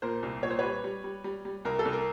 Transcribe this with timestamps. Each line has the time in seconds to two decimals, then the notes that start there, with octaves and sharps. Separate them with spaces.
0.02 A#2 A#4 C5
0.23 C2
0.43 A#2 C#5
0.51 C5
0.59 G3 B4 C#5
0.84 G3
1.04 G3
1.24 G3
1.45 G3
1.65 C2 A#4
1.79 A4
1.85 C2
1.93 A#4